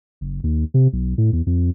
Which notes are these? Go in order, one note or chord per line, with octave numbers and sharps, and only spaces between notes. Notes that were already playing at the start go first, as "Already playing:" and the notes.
F#1
D#2
C3
B1
A2
E2
F2